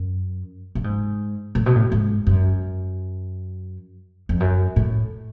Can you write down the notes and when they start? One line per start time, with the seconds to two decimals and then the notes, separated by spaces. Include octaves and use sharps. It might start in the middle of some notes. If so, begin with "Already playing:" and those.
Already playing: F#2
0.75 A2
0.84 G#2
1.55 A2
1.66 B2
1.76 A2
1.92 G#2
2.27 F#2
4.29 F2
4.40 F#2
4.76 A2